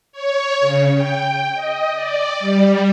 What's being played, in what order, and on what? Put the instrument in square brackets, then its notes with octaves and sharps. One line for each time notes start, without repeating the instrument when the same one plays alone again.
[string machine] C#5
C#3
G5
D#5
D5
G3